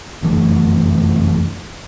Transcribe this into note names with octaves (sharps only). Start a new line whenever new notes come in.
F1 F#2 E3 A3